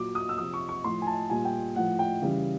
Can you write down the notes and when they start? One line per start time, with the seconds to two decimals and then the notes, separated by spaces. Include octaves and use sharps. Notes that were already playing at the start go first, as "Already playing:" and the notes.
Already playing: A#2 F#3 D6
0.15 D#6
0.29 E6
0.38 C3 F3 D#6
0.54 C#6
0.69 C#6
0.84 A2 F3 C6
1.02 G#5
1.07 A5
1.30 A#2 G3 G#5
1.45 G5
1.76 A2 F3 F#5
1.99 G5
2.22 C#3 E3 G3